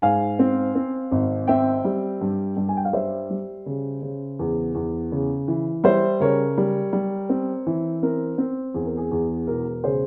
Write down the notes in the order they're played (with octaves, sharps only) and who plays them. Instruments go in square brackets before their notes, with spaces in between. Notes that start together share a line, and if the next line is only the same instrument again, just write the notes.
[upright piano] G#2 F5 G#5
C4
C4
G#1
C4 E5 G5
G3
G2
G2
G#5
G5
F5
G3 C5 E5
G3
C#3
C#3
E2
E2
C#3
E3
G3 C5 E5
C#3 A#4 C#5
G3
G3
C4
E3
C4 A#4
C4
E2 G#4
A#4
G#4
E2
E1 A#4
C#3 G#4 C5